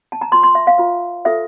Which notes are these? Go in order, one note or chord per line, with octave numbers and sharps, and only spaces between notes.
A5
A#5
F4 C5 C6
C6
E5
F5
F4 C5
F4 A4 C5 E5